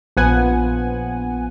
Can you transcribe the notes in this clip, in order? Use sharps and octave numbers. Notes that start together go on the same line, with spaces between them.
A#1 F3 B3 F#5 G#5